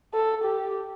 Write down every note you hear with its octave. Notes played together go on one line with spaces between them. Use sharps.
A4
G4